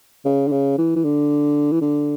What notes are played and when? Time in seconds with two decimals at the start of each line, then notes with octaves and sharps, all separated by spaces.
0.25 C#3
0.47 D3
0.52 C#3
0.78 E3
0.96 E3
1.04 D3
1.72 E3
1.81 D3